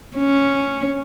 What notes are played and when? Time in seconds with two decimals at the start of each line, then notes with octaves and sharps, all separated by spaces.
0.16 C#4